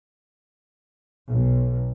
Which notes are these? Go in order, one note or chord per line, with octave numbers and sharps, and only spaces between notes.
B1